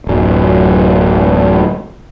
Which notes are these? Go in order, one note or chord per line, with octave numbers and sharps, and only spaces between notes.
D1 F#2